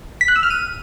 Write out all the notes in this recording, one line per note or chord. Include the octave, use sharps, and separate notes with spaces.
B6
F#6
E6
F6
D#7